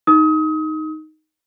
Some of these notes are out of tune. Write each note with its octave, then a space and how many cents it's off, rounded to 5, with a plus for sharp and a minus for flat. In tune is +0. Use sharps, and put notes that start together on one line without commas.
D#4 +0 D#6 +30